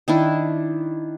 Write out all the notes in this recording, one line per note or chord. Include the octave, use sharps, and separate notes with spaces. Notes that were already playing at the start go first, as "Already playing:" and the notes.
D#3 D4 E4